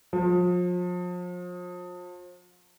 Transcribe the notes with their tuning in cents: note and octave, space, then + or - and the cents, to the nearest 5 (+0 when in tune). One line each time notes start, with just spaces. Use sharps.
F3 +35